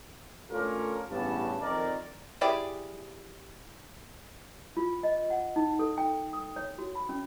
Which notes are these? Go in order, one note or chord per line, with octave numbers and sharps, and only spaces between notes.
A3 C#4 D4 F4 A4 A#4
A1 E2 G2 B3 C#4 A5
F2 D#3 A#4 D5
E4 G4 G#4 D5
F4
D#5
F#5
D#4
A4
G5
D#6
C#5
F#4
B5
C#4